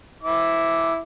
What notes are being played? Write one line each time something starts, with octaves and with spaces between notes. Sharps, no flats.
E4 E5 D6